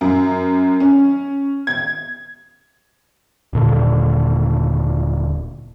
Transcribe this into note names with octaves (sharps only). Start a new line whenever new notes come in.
F#2
C#4
G#6
D#1 A#2 D3